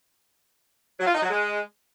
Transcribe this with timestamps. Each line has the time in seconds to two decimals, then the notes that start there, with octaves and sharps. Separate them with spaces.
0.99 F#3
1.07 F4
1.15 D#4
1.22 F#3
1.30 G#3